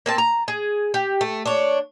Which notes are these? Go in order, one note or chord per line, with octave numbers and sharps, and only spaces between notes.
A#3 C4 A5
A#5
G#4
G4
A3
D4 C#5